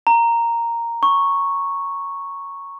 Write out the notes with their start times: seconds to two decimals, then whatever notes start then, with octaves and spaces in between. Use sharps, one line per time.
0.07 A#5
1.03 C#6